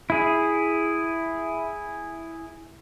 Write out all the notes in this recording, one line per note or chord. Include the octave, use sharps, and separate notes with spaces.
E4 G#4